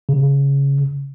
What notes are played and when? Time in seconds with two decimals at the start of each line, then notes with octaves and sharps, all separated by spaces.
0.09 C#3